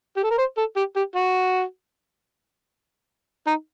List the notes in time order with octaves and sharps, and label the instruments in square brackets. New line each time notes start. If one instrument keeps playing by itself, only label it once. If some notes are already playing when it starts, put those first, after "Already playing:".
[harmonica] G4
A4
A#4
C5
A4
G4
G4
F#4
D#4